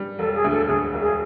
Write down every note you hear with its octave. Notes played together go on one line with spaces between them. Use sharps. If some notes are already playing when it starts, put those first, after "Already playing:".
Already playing: G3
E1 A4
G#4
D2
A4
D2 G#4
E1
G#4